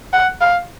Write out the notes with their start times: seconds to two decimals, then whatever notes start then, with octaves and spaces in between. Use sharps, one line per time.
0.13 F#5
0.41 F5